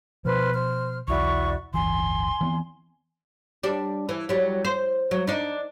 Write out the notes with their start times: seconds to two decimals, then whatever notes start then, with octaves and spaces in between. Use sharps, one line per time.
0.25 B2 F3 B4 C5 F6
0.53 C5 F6
1.08 B1 E2 E4 F#4 D5 C#6
1.74 D1 G1 E3 G#5 C6
2.41 E3 B3 C4
3.63 G3 D4
4.09 E3
4.29 F#3 G3
4.65 C5
5.11 F#3
5.27 D4 D#4